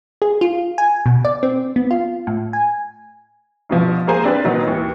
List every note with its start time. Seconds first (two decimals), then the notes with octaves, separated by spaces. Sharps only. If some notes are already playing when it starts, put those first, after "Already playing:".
0.22 G#4
0.41 F4
0.78 G#5
1.06 B2
1.25 D5
1.43 C4
1.76 B3
1.91 F4
2.27 A2
2.53 G#5
3.69 G2 B2 F3
4.07 A#3 G#4 A#4 C5 G#5
4.24 C4 D4 B4
4.44 A#2 D#3 F#3 B3 D#4
4.67 D#2 E3